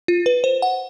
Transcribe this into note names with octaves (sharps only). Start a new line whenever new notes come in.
F4
B4
C5
F#5